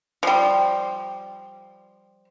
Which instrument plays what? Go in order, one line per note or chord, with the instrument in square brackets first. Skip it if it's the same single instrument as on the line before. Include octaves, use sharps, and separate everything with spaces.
[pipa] F3 G3